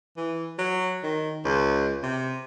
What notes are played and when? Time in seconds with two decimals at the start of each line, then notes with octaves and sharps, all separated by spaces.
0.17 E3
0.59 F#3
1.03 D#3
1.45 C#2
2.03 C3